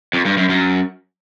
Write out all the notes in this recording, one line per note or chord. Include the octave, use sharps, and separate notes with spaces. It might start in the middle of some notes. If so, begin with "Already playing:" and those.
F2
G2
F#2
F#2